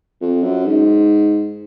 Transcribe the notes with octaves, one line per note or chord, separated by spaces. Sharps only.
F2
F#2
G#2